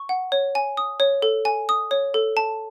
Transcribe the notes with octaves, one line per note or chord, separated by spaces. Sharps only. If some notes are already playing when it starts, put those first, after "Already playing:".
Already playing: C#6
F#5
C#5
G#5
D#6
C#5
A4
G#5
D#6
C#5
A4
A5